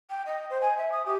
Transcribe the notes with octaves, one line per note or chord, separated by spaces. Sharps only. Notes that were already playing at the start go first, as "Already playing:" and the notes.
G5
D#5
C5
G#5
E5
D#6
G4